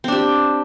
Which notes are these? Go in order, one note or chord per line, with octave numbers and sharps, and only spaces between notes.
C4 D4 G4